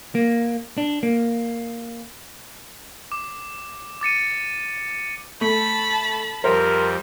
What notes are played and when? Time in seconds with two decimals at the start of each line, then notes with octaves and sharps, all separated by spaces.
0.15 A#3
0.78 D4
1.03 A#3
3.12 D6
4.01 D6 A6 C#7 D#7
5.41 A3 A5 B5
6.44 F2 G3 A#4 C5